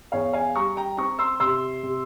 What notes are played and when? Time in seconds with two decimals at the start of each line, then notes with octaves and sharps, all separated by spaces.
0.12 E2 C#5 F5
0.33 F5 G#5
0.55 G3 A#5 C#6
0.77 G5 A#5
0.97 C4 A#5 C#6
1.19 C6 E6
1.40 C3 C6 E6
1.83 C3